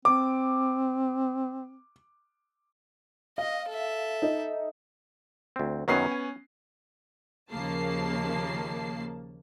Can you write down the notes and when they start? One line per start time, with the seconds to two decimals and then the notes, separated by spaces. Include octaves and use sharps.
0.05 C4 D6
3.38 D#5 F5
3.68 A4 E5
4.22 D#4
5.56 D2 C4
5.88 F#2 D#3 F#3 B3 C#4 C7
6.12 G#5
7.52 D#2 C#3 F3 A#3 A5 C7